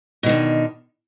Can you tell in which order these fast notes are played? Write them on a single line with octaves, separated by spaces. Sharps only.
B2 D#3 D3